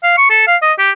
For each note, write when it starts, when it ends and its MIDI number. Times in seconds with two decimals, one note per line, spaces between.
0.03 0.15 77
0.18 0.26 85
0.30 0.43 69
0.48 0.57 77
0.62 0.72 75
0.79 0.91 67